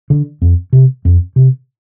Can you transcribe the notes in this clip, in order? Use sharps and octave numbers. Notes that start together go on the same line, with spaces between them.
D3
F2
C3
F2
C3